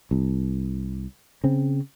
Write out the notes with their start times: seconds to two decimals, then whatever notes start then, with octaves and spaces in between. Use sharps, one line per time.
0.11 C2
1.44 C#3 C4